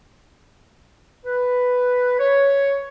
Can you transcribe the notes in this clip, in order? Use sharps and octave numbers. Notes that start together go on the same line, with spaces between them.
B4
C#5